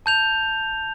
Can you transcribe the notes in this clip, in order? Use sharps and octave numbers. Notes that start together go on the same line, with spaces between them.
A5 G6 F7